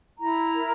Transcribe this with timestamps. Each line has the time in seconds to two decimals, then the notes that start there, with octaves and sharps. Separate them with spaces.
0.19 E4 A#5
0.55 A#4